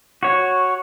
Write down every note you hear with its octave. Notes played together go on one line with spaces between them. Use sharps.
F#4 C#5